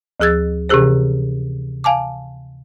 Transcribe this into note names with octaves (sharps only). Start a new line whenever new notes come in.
D2 F3 G#4 E6 G#6 A6
C3 E3 C#4 G4 G#4 C5
F5 G#5 A5 D6